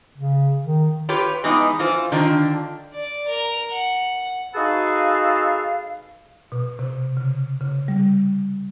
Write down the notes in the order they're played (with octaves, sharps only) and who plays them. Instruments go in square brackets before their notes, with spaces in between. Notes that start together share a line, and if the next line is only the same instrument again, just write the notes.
[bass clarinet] C#3
D#3
[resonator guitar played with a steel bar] F4 G4 B4 C#5
E3 G#3 B3 D#4
E3 F4 C5
D3 D#3 D4 F4
[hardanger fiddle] D5
A#4
F#5
[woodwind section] D#4 F#4 G#4 A4 B4 F5
[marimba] B2
C3
C#3
C#3
G3